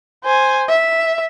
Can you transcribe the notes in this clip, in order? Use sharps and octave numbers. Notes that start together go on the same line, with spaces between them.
C5 G#5
E5